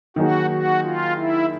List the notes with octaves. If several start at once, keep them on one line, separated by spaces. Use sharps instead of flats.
D#3 F#3 A#3 D#4 F#4 G#4
F#4
F4
E4